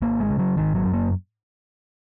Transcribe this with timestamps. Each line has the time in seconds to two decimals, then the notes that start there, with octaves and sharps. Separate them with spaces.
0.02 G#1 A#3
0.20 G#3
0.30 C#3
0.39 F#3
0.57 G#1 D#3
0.75 F#3
0.84 F#2
0.94 A#3